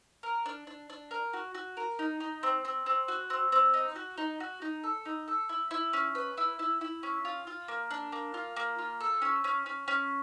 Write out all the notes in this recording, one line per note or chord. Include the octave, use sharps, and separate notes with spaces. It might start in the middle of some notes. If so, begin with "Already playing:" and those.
A#4
D4
D4
D4
A#4
F#4
F#4
A#4
D#4
D#4
C4
C4
C4
F#4
C4
C4
D#4
F#4
D#4
F#4
D#4
A4
D#4
A4
E4
E4
C#4
B4
E4
E4
E4
C#4
F4
F4
A#3
D4
A#3
F4
A#3
F4
A4
C#4
C#4
C#4
C#4